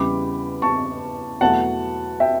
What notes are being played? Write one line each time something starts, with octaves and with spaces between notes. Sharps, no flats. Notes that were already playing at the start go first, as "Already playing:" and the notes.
Already playing: E2 C#3 E3 G3 B5 D6
A5 C#6
E2 B2 F#3 A3 F#5 A5
E5 G5